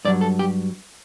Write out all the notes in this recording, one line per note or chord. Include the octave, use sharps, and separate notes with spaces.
G2 F#3 D5
A4
G4